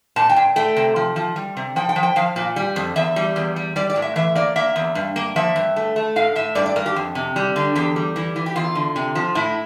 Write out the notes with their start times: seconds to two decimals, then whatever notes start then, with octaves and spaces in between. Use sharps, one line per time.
0.16 A#2 A5
0.29 G5
0.36 A#2
0.56 A3 G5
0.76 C3
0.96 F3
1.16 F3
1.36 G3
1.57 C3
1.76 F3 G5
1.89 G5
1.96 F3
2.03 G5
2.16 F3 F5
2.36 A#2
2.56 G3
2.76 F2
2.96 E2 E5
3.16 G3
3.36 E2
3.56 G3
3.76 G3 D5
3.90 D5
3.96 A2
4.02 E5
4.16 E3 E5
4.35 A#3 D5
4.56 A#3 E5
4.76 E2
4.95 G2
5.16 A#3
5.36 F3 E5
5.56 G2
5.76 A3
5.96 A3
6.16 A2 F5
6.36 A2 E5
6.55 G2 D5
6.66 D5
6.76 G2 A#4
6.86 G4
6.96 F2
7.15 C3
7.36 G3
7.56 D3
7.75 E2 G4
7.96 G3
8.16 E3
8.36 E3
8.46 G4
8.56 E2 F4
8.75 D3
8.96 C3
9.15 F3
9.35 A2 E4